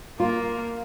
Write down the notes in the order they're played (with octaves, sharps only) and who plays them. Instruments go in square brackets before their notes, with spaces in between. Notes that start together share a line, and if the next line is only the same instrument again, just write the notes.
[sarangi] A#3 [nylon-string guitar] F4